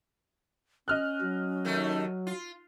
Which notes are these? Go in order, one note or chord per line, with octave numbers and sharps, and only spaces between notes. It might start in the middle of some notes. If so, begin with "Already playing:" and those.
C#4 D#5 F6 F#6
F#3
D#2 D#3 A3
F4